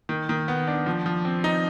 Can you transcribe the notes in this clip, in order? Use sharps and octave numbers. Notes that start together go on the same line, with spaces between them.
D#3
D#3
B3
D4
F3
F3
C4
D#4